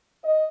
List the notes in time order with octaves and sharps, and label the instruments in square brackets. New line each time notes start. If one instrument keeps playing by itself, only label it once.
[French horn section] D#5